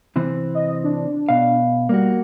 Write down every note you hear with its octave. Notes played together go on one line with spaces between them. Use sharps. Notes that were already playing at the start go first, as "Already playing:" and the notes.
C3 E3 C4
D#5
D4
B2 F5
G3 A#3 F#4